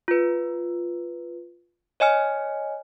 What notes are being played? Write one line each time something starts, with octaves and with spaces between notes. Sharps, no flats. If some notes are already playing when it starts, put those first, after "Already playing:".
F4 B4
C#5 D#5 G#5 F6